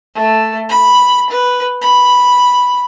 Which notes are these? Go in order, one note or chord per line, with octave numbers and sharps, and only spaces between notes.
A3
B5
B4
B5